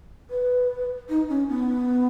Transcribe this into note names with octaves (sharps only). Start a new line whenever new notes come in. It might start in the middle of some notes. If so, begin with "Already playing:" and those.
B4
D#4
C#4
B3